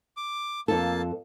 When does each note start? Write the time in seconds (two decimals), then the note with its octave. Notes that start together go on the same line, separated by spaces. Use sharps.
0.17 D6
0.68 F2 A#3 F4 A4 A5